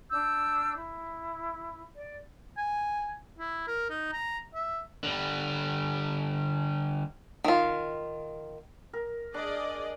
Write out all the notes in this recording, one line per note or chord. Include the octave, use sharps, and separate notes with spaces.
D4 E6 G6
E4
D5
G#5
E4
A#4
D#4
A#5
E5
D3 G3
D#3 F4
A#4
D4 G#4 D5 D#5